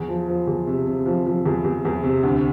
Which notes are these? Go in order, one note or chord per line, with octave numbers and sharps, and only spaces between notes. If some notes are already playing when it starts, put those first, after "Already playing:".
Already playing: E2
F3
F3
E2
C3
C3
F3
F3
E2
E2
E2
C3
D2